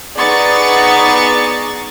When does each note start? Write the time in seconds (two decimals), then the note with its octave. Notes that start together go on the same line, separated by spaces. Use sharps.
0.18 B3 D#4 G#4 D5 C#6 A6